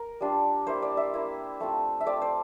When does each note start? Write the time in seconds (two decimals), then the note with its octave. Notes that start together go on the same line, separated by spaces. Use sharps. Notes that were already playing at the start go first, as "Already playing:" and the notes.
Already playing: A#4
0.21 G3 D4 F4
0.67 A#3 E4 C5
0.82 D5
0.97 E5
1.14 A#3 E4
1.60 A3 C4 F4
2.00 E5
2.06 A3 C4 F4 D5
2.22 C5